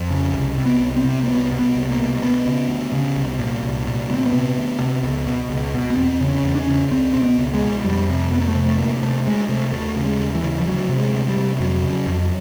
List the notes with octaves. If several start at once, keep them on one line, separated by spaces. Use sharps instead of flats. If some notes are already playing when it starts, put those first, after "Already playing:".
Already playing: F2
C#3
C2
C3
B3
C2
C4
C3
A#3
C2 B3
B2
B3
C2
A#3
B2
D2 B3
C#3
D2
C#3
C2
A#2
C2
A#2
D2 B3
C4
B3
C3
D2
C3
C#2
B2
C#2
B2
B3
E2 C4
C#3
C#4
E2
D4
C#4
C#3
C#2 C4
B2 C4
B3
C#2
G#3
B2
F2 G3
C3
F2 B3
A#3
A3
C3
A3
D2 A#3
C3 A3
D2 G#3
C3 A3
D#2 A3
C#3
G#3
D#2
E3
C#3
F3
D2 F#3
C3
G#3
D2
G3
C3
F2 F#3
C#3
F2